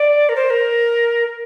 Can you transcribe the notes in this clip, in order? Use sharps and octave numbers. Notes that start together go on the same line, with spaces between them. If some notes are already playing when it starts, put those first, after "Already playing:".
Already playing: D5
A#4
C5
A#4